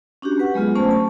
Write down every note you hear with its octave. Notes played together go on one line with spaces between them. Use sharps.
C#4 D4 F#4 G4
B4 F#5
F#3 G#3 B3 F4 G#4
A3 C#4 C5 A5
A5